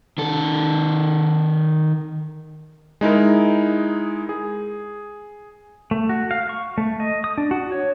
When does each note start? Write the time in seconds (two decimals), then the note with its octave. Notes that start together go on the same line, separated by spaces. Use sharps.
0.18 D#3 A4
3.01 G#3 D#4 E4 A#4
4.29 G#4
5.91 A3
6.09 F#4
6.31 F5
6.49 C#6
6.78 A3
7.00 D#5
7.24 D#6
7.38 D4
7.51 F#4
7.72 C#5